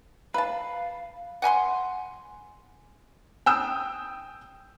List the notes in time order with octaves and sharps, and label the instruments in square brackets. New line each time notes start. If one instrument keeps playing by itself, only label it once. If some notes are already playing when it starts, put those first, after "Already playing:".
[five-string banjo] B4 A5 [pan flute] F5
[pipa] F#5 G#5 B5 C6
[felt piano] G5 D#6 E6